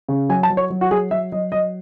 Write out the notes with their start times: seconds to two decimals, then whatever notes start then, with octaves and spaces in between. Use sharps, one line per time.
0.09 C#3
0.29 F#3 G#5
0.43 A5
0.50 F#3
0.57 C#5
0.70 F#3
0.81 F#4
0.91 F#3 G#4
1.11 F#3 E5
1.32 F#3 D#5
1.52 F#3 D#5